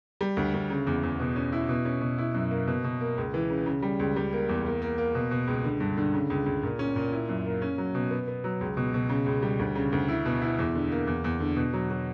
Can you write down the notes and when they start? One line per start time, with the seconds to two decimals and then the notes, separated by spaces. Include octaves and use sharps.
0.21 G3
0.37 D2
0.54 D2
0.70 C#3
0.87 E2
1.03 E2
1.20 B2
1.36 C#4
1.52 E4
1.69 B2
1.85 C#4
2.01 B2
2.18 E4
2.35 F#2
2.51 A#3
2.67 B2
2.84 B2
3.01 A#3
3.17 C#2
3.34 E3
3.50 C#3
3.66 C#3
3.82 G3
4.00 C#2
4.16 G3
4.33 A#3
4.49 E2
4.66 A#3
4.82 A#3
4.98 A#3
5.15 B2
5.31 B2
5.47 C#2
5.64 D3
5.80 G2
5.97 D3
6.14 C#3
6.30 C#2
6.46 C#2
6.63 A#2
6.79 C#4
6.96 A#2
7.12 E4
7.29 F#2
7.45 A#3
7.62 C#4
7.78 F#3
7.95 B2
8.11 B3
8.28 B3
8.44 F#3
8.61 C#2
8.77 B2
8.94 B2
9.09 C#3
9.26 C#2
9.42 G3
9.59 D2
9.75 C#3
9.92 D2
10.08 E4
10.26 B2
10.42 E4
10.59 E2
10.75 D3
10.92 A#3
11.07 E2
11.24 E2
11.40 D3
11.57 B2
11.73 F#3
11.90 F#3